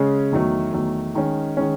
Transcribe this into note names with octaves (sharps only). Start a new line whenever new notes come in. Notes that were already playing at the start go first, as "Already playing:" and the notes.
Already playing: C#3 G#3 C#4
E2 D#3 F#3 A3
E2 D#3 F#3 A3
D#3 G#3 C#4
D#3 G#3 C#4